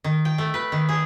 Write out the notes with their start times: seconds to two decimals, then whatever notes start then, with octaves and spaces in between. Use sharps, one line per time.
0.04 D#3
0.25 G5
0.38 A3
0.54 B4
0.72 D#3
0.89 G#4